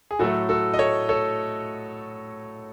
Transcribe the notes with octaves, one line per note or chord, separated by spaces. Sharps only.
G#4
A2 F#3 A3 F#4 A4
F#4 A4
D#5
A4 C#5
A4 C#5